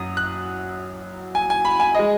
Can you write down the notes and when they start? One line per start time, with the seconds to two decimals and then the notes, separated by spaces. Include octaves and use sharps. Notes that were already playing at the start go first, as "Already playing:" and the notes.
Already playing: F#2 F#3 D#6
0.17 F#6
1.35 G#5
1.50 G#5
1.65 B5
1.80 G#5
1.95 G#3 D#5